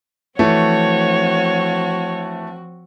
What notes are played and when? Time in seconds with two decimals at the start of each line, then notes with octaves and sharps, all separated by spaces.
0.39 E3 F3 A3 C4 F#4 C#5